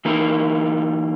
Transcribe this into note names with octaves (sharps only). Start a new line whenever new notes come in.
E3 A#3 D#4 A#4